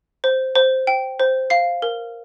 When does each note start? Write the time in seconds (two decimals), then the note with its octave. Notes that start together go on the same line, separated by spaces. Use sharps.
0.24 C5
0.55 C5
0.87 G5
1.20 C5
1.50 F5 C7
1.82 A#4